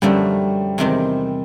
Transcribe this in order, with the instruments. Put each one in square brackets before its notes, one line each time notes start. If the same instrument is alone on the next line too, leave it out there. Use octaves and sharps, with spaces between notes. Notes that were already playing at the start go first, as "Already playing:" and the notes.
[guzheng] F#2 D3 F3 A3 [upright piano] G3
[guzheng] E2 C3 D#3 G#3 C4